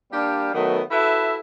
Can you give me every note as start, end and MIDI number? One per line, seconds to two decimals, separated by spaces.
0.12 0.52 55
0.12 0.52 58
0.12 0.52 62
0.12 0.52 67
0.12 0.52 77
0.54 0.81 51
0.54 0.81 54
0.54 0.81 57
0.54 0.81 59
0.90 1.38 64
0.90 1.38 66
0.90 1.38 69
0.90 1.38 71
0.90 1.38 76